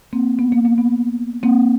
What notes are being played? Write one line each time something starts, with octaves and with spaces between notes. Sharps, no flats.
A#3 C4
B3
A#3
A#3
B3
A#3 C4